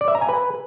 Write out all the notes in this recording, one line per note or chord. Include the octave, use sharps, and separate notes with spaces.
D5
E5
A#5
G#5
B4